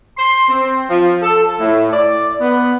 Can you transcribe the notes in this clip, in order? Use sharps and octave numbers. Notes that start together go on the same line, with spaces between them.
C6
C4
F3
A4
A2
D5
B3